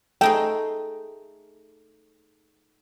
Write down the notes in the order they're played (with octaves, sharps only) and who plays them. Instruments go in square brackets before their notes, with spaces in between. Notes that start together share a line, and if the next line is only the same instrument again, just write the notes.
[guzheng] A3 D#4 G#4 [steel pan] G5